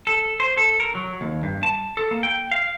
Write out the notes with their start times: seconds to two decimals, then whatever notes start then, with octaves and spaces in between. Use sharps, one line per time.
0.07 A4
0.40 C5
0.57 A4
0.80 A#4
0.95 F#3
1.21 D#2
1.43 G2
1.63 A5
1.97 A4
2.11 A#3
2.23 G5
2.51 F5